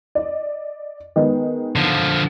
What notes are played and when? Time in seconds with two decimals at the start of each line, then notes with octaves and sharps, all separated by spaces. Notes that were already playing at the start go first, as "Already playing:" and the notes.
0.15 D5 D#5
1.16 D#3 G#3 B3
1.76 D3 F3